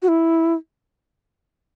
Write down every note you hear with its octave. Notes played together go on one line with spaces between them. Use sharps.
F#4
E4